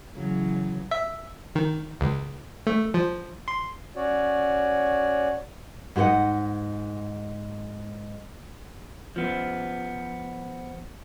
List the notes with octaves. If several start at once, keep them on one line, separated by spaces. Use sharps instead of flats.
C#3 E3 F#3
E5
D#3
C#2
A3
F3
C6
C#4 F#4 C#5 D5
G#2 G4 C5 D#5 F#5
F3 B3